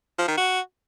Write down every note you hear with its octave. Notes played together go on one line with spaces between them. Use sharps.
F3
D#3
F#4